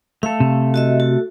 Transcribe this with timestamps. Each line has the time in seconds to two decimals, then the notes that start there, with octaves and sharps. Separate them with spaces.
0.23 A3 A4 F5
0.40 C3
0.74 F#4 D#5 E5
1.00 F#4